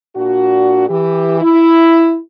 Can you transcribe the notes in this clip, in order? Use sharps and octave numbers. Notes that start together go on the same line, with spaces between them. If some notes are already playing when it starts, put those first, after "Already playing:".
A#2 D4 F#4
E3 G4
E4